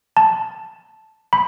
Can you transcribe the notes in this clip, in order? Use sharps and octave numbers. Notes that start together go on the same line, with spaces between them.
A5
B5